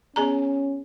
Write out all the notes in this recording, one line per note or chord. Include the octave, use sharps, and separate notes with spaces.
B3 C#4 G#4 A#5